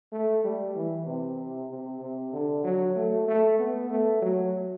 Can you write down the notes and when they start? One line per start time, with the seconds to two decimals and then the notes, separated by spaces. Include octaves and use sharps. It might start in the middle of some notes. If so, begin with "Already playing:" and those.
0.12 A3
0.44 G3
0.75 E3
1.06 C3
1.70 C3
2.01 C3
2.33 D3
2.64 F#3
2.96 A3
3.28 A3
3.59 B3
3.90 A3
4.22 F#3